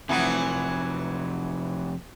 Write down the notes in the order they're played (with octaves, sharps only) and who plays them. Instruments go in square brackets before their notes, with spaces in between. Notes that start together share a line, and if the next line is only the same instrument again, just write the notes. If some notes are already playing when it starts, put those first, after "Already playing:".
[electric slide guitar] F2 C3 [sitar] E3 F#3 B3